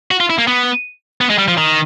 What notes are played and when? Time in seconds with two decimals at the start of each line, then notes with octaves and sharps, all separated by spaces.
0.11 F#4
0.20 F4
0.30 E4
0.38 A#3
0.47 B3
1.21 B3
1.30 G#3
1.38 G3
1.48 F3
1.58 D#3